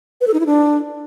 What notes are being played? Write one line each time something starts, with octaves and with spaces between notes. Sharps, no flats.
B4
A4
D#4
E4
D4